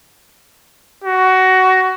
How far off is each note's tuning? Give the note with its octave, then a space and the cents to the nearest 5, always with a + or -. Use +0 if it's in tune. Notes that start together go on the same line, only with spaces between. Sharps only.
F#4 +15